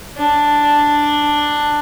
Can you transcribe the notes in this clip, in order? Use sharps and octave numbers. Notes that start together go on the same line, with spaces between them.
D4